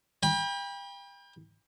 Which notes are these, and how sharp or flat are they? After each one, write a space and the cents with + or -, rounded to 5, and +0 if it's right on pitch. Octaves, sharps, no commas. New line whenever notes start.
G5 +35 B5 -30